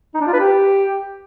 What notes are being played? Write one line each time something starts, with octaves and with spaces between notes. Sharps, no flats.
D#4
D4
F4
B4
G4